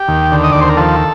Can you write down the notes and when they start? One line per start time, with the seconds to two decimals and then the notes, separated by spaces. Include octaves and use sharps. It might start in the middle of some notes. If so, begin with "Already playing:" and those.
Already playing: G4
0.08 D#2
0.32 D3
0.44 D#5
0.52 D#2 D5
0.61 C5
0.69 A#4
0.77 F3 A4